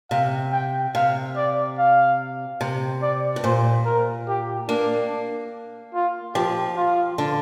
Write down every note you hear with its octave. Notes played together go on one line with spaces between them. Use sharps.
C3 F5
G5
C3 F5
D5
F5
C3
D5
G2
A#2 C5
A#4
G4
A#3 D4
F4
F3 G4
F4
D3